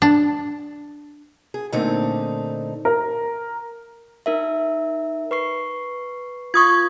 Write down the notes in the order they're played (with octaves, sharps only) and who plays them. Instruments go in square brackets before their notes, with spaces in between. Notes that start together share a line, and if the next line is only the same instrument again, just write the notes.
[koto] D4
[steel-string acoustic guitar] G#4
A#2 D3 A3 C4 D#4
[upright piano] A#4
[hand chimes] D#4 A#4 E5
B4 C#6 C7
[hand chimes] F4 [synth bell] C#6 D#6 G#6